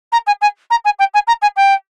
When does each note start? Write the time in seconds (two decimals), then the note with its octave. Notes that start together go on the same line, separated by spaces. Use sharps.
0.12 A#5
0.26 G#5
0.41 G#5
0.70 A#5
0.84 G#5
0.99 G5
1.14 G#5
1.27 A#5
1.42 G#5
1.56 G5